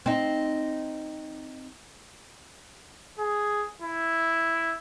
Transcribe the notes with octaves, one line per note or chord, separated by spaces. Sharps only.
C4 D#4
G#4
E4